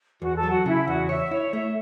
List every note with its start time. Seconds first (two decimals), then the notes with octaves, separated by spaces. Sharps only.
0.21 E2 F#4
0.36 A4
0.43 F#3
0.50 F#4
0.66 C#3 E4
0.87 E2 F#4
1.09 C#5 E5
1.31 E4 C#5
1.53 A3 E5